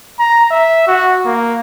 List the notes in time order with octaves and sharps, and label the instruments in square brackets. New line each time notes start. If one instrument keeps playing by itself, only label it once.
[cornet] A#5
E5
F#4
A#3